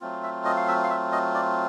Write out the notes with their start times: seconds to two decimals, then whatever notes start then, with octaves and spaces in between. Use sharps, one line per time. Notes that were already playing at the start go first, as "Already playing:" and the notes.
0.01 F#3 A3 C4 F4
0.23 E5
0.45 D#5
0.57 F5
0.68 E5
0.84 F5
0.90 E5
1.12 D#5
1.34 D5